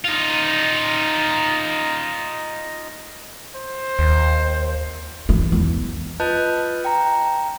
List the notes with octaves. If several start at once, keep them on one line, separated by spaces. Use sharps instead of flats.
D#4 F4
C5
D#2
E3
E2
F4 B4 D#5 A5 F#6 G6
G5 A#5